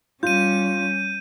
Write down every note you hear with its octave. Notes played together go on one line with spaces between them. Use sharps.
G3 C#4 F4 G6 D#7